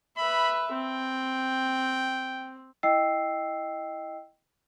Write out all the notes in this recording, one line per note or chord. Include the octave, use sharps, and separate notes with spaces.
B4 E5 B5
C4 G5
E4 D#5 G5 E6 C7